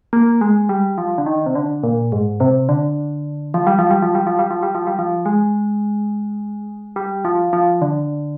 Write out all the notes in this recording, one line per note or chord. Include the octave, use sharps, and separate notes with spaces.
A#3
G#3
G3
F3
D3
D#3
C3
D3
A#2
G#2
C3
D3
F3
G3
F3
G3
F3
G3
F3
G3
F3
G3
F3
G3
F3
G#3
G3
F3
F3
D3